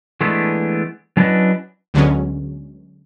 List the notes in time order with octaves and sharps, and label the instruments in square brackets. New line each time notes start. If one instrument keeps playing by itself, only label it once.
[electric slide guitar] E3 G#3 A3 B3 D4 E4
F#3 C#4 D4 E4 B4 D#5
[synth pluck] D2 D3 F#3 G#3 B3 C#4